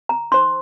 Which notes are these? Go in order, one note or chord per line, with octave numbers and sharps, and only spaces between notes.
A#5
D#4 C5 C6